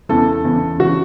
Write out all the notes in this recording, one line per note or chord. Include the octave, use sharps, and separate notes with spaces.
E2 C#3 E3 A4
E2 C#3 E3
C#3 E3 F#4